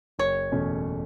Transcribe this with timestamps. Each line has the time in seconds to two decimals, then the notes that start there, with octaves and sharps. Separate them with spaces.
0.19 F#1 C#5
0.52 E2 B2 A3 C#4